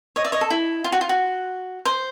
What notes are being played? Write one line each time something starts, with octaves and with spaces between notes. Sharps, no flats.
C#5 D#5
D5 E5
C#5 D#5
A4
E4
F4
F#4
F4
F#4
C5